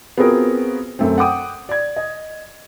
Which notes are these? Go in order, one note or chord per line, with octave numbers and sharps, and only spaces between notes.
B3 C4 F4 F#4 G#4 A#4
F#2 A3 C4
F#5 G5 D6 D#6
D5 G#6
D#5